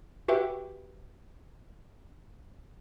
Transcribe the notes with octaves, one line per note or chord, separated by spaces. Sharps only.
F#4 G4 B4 E5 G5